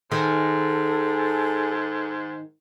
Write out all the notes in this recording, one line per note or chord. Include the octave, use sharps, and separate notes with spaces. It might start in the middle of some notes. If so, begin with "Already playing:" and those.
G#2 D#3 G#4 A4